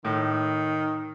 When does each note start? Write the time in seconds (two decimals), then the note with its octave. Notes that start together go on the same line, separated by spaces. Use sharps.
0.05 A2 D#3